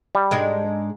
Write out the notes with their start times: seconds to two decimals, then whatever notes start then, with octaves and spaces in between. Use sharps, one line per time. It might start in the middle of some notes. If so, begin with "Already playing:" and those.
0.15 G3
0.31 G#2 G#3 D4